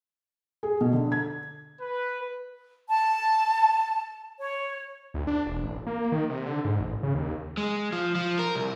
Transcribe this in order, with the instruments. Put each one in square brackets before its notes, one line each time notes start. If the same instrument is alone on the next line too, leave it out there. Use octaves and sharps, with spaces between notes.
[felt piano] G#4
B2
D3
G#6
[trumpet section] B4
[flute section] A5
C#5
[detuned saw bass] D2
D4
E1
A1
A#3
D#3
C3
D3
G#2
A1
C#3
D#2
[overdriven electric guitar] G#3
F3
F3
A#4
C2